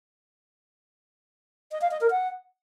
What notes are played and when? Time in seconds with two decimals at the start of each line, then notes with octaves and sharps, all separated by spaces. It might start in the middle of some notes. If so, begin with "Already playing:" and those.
1.72 D#5
1.81 F5
1.91 D#5
2.01 A#4
2.10 F#5